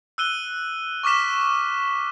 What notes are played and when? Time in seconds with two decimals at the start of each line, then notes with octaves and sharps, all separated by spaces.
0.18 E6 F#6 D#7 G7
1.03 C#6 D6 F6 B6 E7